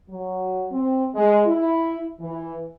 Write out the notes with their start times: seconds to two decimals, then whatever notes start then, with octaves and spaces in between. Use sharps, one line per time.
0.10 F#3
0.72 C4
1.15 G#3
1.46 E4
2.20 E3